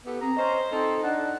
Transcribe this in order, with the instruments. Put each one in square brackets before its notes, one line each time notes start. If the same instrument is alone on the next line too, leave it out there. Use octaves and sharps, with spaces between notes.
[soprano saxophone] B3 [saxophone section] E4 G4 A4
[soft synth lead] C4 [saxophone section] G#4 [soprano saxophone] A#5
[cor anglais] C#4 [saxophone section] C5 [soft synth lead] D#5
[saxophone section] A#2 D#4 [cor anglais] C4 [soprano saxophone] A4
[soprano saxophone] D4 [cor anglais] F#5